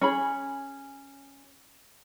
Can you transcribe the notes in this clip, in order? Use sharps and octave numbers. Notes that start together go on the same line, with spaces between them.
C#4 G#4 B5